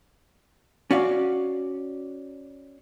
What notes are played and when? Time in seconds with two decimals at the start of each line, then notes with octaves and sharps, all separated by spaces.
0.91 C#4 F#4 D5 F5